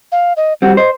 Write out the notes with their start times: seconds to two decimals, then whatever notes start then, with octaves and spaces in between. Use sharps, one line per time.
0.12 F5
0.37 D#5
0.62 G3 C4 F#4 F#5
0.77 C5 D#5